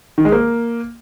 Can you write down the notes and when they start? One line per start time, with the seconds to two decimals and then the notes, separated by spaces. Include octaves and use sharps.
0.18 D#3
0.25 G#3
0.32 A#3